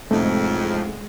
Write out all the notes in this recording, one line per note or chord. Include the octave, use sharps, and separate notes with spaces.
A1 F2 A2 C3 G#3 A3 D#4